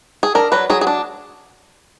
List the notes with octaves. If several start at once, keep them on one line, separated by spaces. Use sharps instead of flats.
G#4
D4 A#4
F#3 B4
F#3 G#4
G#4
D4